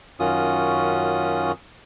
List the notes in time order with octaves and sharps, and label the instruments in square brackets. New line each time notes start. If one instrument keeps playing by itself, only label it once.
[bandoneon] F#2 D#3 C#4 F4 F#4 D#6